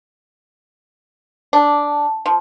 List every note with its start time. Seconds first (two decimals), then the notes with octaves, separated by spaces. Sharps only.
1.53 D4
2.26 F3